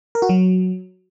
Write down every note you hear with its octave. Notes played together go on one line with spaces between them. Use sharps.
A#4
F#4
F#3